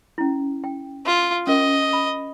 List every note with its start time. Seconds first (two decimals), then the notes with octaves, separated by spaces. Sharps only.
0.18 C#4 E4
0.64 G5
1.06 F4
1.47 C#4 A#4 D#5
1.93 B5